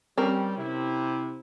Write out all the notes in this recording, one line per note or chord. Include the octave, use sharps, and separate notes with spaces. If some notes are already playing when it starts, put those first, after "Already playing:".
G3 C4 C#4 A#4
C3 E4